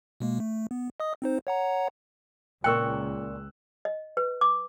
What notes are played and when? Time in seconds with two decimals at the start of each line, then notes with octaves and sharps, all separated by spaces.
0.20 B2 G#3 A#3
0.40 A3
0.71 B3
1.00 D#5 D#6
1.22 C4 D#4 C5
1.47 C#5 F#5 A#5
2.64 C#2 A#2 A#4 G5 C#6 E6 F#6
3.85 D#5
4.17 B4
4.41 D6